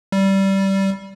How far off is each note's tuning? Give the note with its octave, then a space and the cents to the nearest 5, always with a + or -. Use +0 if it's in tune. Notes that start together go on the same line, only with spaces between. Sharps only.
G3 -15